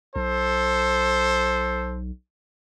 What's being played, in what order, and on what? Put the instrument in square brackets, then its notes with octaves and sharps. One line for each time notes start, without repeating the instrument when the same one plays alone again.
[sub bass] B1 [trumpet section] A4 C5